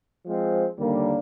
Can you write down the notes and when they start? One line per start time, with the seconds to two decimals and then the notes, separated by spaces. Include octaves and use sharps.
0.25 F3 G#3 C4
0.77 D#2 D3 G3 A#3 D4